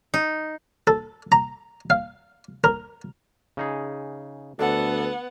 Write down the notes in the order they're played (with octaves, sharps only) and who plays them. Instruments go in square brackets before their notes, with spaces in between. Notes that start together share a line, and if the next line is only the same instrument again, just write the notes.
[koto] D#4
[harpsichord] A4
A#5
F5
A#4
[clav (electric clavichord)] C#3 D#4 G#4
[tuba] D2 [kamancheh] B3 F#5 [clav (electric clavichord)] D4 [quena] A4